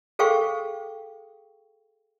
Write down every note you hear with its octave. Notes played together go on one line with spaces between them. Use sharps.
G#4 A4 C5 F5 G5 C#6